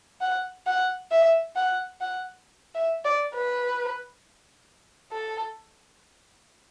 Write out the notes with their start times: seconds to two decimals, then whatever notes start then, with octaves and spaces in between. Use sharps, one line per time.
0.21 F#5
0.67 F#5
1.12 E5
1.56 F#5
2.01 F#5
2.75 E5
3.05 D5
3.35 B4
5.12 A4